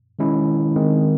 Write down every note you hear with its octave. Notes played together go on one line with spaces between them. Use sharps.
D#3 G#3 C#4 E4
D#3 G#3 C4